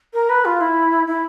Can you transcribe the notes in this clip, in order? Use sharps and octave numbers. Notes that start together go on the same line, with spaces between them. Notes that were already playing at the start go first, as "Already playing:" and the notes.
A#4
B4
F4
E4
E4